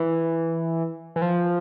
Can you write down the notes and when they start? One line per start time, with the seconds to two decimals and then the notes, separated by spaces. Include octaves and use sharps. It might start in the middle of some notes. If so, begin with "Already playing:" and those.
Already playing: E3
1.16 E3
1.22 F3